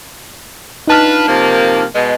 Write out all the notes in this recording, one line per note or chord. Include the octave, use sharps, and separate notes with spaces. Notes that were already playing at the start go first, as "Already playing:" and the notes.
D4 D#4 F4 B4 A5 F6
C3 F3 A#3
B2 G#3